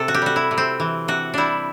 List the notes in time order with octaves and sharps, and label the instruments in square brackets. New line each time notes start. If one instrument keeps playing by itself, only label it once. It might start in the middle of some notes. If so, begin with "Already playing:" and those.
Already playing: [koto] C3 A4
F#4
G4
G3 F#4
E4
C3
C4
E3
C3 F#4
G3 D4 E4